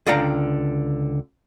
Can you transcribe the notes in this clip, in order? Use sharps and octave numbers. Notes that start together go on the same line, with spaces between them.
C#2 D3 D5 F5 G5 A#5